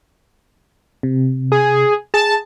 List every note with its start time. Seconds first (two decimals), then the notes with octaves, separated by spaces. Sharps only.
1.03 C3
1.52 G#4
2.14 G#4 A5